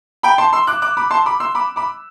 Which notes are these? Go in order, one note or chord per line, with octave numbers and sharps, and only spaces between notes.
G5 B5
A5 C6
C6 E6
D6 F#6
D6 F#6
B5 D6
A5 C6
B5 D6
C6 E6
B5 D6
B5 D6